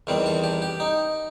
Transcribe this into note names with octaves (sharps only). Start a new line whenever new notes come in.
E2 D#3 G3 C4
A4
G4
G4
D#4